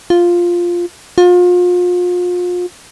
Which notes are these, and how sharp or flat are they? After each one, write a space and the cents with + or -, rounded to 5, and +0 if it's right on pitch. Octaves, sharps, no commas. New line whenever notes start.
F4 +0
F4 +35